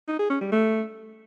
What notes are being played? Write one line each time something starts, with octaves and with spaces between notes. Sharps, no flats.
D#4
G#4
C#4
G3
A3